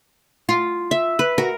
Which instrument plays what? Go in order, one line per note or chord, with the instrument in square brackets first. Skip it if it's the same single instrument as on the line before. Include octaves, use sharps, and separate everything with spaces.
[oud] F4
[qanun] E5
B4
[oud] F#4 [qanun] A#4